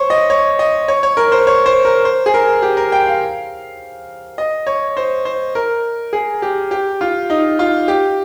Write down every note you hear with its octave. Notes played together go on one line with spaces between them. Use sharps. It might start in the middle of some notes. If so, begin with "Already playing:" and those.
Already playing: C5 C#5
D#5
C#5
D#5
C#5
C#5
A#4
C5
C#5
C5
A#4
C5
G#4
A#4
G4
A#4
G5
F5
D#5
C#5
C5
C5
A#4
G#4
G4
G4
F4
D#4
F4
G4